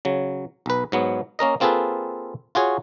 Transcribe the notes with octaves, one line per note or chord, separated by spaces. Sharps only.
C#3 F#3
B1 B4
G#2 F#3 B3
A#3 C#4 A#4 D#5
A#3 C4 F4 G#4 A4 B4
F4 F#4 G#4 C#5